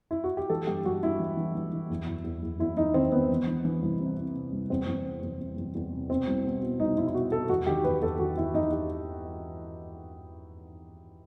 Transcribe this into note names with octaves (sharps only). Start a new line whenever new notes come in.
E4
F#4
G4
E3 A4
G2 G4
G2 F#4
G2 E4
E3
E3
E3
E3
E2
E2
E2
E2
E2 E4
E2 D#4
D#3 C4
D#3 B3
E3
E3
E3
C2
C3
C3
C3
C2
E2 C4
E2
C3
E2
C3
E2
E2
C3
B2 C4
C2
B2
B2
C2 D#4
C2 E4
E4
B2 F#4
B2 A4
E2 F#4
D#3 G4
E2 B4
E2 A4
D#3 F#4
E2 E4
E2 D#4
G4